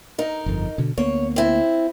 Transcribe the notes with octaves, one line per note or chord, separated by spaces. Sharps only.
D#4 A#4
G1 F2
B2 D3
D2 A#3 B3 C#5
C4 E4